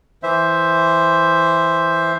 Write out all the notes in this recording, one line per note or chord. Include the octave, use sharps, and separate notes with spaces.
E3 C5 E5